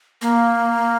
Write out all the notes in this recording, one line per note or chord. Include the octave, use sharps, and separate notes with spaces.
A#3